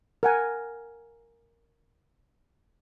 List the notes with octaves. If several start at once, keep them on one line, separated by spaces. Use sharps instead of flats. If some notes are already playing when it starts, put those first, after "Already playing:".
A#4 F#5 G#5